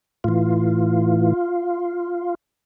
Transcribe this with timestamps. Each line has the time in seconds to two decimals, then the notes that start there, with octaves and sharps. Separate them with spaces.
0.24 A2 E3 F4